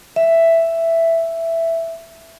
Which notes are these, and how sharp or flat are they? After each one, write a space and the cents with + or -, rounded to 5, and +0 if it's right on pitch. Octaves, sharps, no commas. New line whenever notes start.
E5 +5